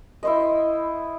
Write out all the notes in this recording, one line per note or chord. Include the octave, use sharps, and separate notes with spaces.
E4 C5 D#5